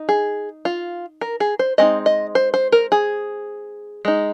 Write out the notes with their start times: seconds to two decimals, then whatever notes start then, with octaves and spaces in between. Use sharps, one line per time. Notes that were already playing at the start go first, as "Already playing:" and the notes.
Already playing: D#4
0.09 G#4
0.65 F4
1.21 A#4
1.40 G#4
1.59 C5
1.78 G#3 C4 D#4 D#5
2.06 D#5
2.35 C5
2.54 C5
2.72 A#4
2.92 G#4
4.05 G#3 D#4